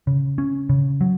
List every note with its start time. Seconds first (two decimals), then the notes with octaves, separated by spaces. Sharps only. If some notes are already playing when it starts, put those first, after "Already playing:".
0.07 C#3
0.38 C#4
0.70 C#3
1.01 F#3